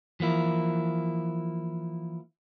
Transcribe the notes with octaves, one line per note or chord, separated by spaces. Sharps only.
E3 F3 A#3 E4